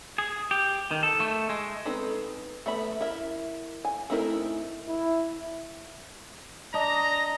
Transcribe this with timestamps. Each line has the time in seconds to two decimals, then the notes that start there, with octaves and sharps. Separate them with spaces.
0.18 G#4
0.51 G4
0.91 D#3
1.03 A4
1.20 A3
1.49 G#3
1.85 B3 C4 D#4 A4
2.66 A3 B3 E5 B5
3.01 E4 A#4 E5
3.85 G#5
4.10 A3 C4 D#4 E4 A#4
4.88 E4
6.74 D4 D#5 A#5